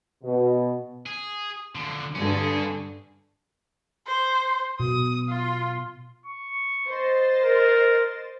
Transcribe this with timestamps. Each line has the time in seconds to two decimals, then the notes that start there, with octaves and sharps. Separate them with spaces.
0.23 B2
1.06 G#4
1.75 D3 F3
2.15 G2 D3 C#4 G#4
4.07 C5
4.80 B2 D#6
5.29 F4
6.26 C#6
6.88 C5 D#5 A6
7.43 A#4